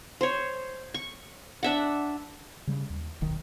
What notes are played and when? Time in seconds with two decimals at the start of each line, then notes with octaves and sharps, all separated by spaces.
0.21 C5 C#5
0.94 C#6
1.63 D4 E5 F#5
2.67 C#3 G3
2.90 D#2
3.21 D#1 B1 D#3